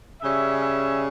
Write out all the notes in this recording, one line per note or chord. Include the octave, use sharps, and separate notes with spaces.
C#3 G3 C#4 E5
E5